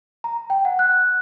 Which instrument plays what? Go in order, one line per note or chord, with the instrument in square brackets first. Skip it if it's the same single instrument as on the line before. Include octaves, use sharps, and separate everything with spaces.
[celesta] A#5
G5
F#5
F#6